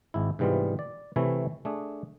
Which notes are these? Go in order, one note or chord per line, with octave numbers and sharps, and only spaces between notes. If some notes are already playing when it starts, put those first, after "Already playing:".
G#1 G#2 E4
G#2 C3 E3 G3 B3 F4
D5
C3 E3 A3 E4 C#5 G#5
A3 D4 G#4